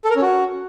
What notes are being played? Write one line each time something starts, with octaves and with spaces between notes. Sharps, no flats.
A4
A#4
C#4
F#4